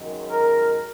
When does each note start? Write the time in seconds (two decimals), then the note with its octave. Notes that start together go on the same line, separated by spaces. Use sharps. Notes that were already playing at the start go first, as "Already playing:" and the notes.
Already playing: F#2 D#3 G#3
0.27 A#4